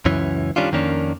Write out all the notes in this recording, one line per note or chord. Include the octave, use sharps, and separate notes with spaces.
C#2 F#2 E3 C#4
D#3 G3 C#4 D4 F4
F2 D#3 A#3 C#4 D4